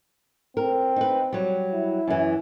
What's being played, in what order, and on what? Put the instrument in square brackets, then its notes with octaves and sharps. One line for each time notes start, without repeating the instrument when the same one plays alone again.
[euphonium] C4 [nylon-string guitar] A#4
[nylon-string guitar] D#4 B4
F#3 G3
[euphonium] E4
[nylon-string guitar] F#2 E3